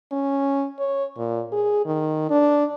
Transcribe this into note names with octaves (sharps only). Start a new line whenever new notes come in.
C#4
C#5
A#2
G#4
D#3
D4